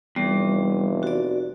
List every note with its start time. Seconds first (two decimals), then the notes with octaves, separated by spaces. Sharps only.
0.16 F1 E2 G3
1.03 F#4 D5